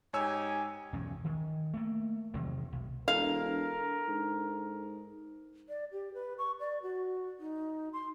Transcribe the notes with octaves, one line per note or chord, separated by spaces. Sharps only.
G#2 D#4 G4 C#5 G#5 E6
B1 E2 G2 C#4
D#3
A3 A#3
E2 C3 D#3 F#3
B1
E1 D4 A4 A#4 F5
G#2
D5
G4
B4
C#6
D5
F#4
D#4
C6